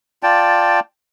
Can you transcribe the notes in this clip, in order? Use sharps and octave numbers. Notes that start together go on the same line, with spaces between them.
F4 D5 G5 A5